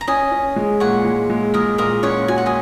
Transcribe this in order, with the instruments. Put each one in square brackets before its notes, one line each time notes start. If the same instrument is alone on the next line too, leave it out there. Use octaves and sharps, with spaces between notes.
[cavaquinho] A#5
[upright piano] C#4 [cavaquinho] D#5 G#5
[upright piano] C#4
G#3
[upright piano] A#2 [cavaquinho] C#5 F#5
[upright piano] G#3
G#3
[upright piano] G#3 [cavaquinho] A#4 D#5
[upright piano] A#2 [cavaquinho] A#4 D#5
[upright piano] C#4 [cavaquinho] C#5 F#5
[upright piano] F#4 [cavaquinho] G#5
[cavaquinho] F#5
D#5 G#5